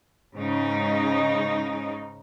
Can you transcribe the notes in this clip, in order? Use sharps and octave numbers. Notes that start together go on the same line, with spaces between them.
G#2 C#3 D#4